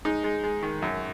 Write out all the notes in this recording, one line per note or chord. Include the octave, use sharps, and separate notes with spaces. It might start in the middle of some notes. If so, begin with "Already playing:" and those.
G#3 D#4
G#3
G#3
D#3
F#2